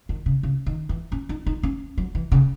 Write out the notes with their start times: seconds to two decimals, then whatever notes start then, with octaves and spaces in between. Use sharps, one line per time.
0.09 D#3
0.26 C#3
0.43 C#3
0.66 D#3
0.89 E3
1.12 C#4
1.29 D#4
1.47 D#4
1.63 C#4
1.98 F#3
2.15 E3
2.32 C#3